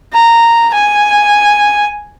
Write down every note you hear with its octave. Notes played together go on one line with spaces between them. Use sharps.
A#5
G#5